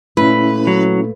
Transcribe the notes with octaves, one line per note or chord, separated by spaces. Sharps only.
A#2 A3 C#4 E4 B4
F#3